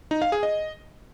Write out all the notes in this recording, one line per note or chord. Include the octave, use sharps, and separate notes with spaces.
D#4
F5
G#4
D#5